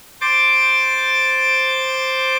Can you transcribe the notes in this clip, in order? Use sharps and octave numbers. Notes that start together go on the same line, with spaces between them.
C5 D6 A6